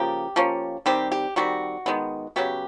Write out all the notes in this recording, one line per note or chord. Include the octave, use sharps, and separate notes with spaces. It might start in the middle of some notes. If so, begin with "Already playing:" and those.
Already playing: C#3 F3 A#3 G4
F3 A#3 C#4
D#3 G3 C4 G4
G4
D#3 G3 C4 F#4
D#3 G#3 B3
C#3 F#3 B3 G4